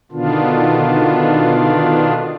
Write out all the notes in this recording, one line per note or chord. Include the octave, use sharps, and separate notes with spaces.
B2 D3 D#3 B3 D4 F4